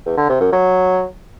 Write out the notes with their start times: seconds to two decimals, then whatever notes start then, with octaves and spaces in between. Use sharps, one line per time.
0.06 E2
0.17 D3
0.29 C3
0.41 F#2
0.52 F#3